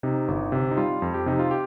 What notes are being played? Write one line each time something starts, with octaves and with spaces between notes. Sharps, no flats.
C3 D#4
G1
C3
D#4
G3 F4
F2
G4
C3 D#4
F4
G4